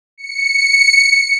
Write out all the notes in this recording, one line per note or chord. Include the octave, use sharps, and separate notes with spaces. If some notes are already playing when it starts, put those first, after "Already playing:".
C#7